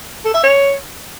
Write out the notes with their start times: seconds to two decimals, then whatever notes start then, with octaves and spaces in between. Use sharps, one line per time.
0.25 A4
0.34 E5
0.43 C#5